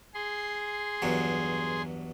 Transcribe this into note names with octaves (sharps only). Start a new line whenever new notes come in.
G#4 C6
E2 G2 F#3